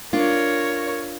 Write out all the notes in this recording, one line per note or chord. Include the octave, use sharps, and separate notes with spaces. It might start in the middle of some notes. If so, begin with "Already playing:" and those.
D4 F4 A#4 C#5